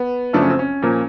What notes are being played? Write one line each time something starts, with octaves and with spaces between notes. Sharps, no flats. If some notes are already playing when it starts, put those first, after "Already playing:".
Already playing: B3
F#2 C#3 F3 A3 D4
C#4
C4
C#4
A#2 F3 A#3